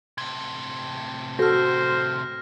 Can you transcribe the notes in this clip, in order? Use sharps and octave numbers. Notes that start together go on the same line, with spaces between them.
A2 C3 G#6
F#4 A4 C5 F6 A#6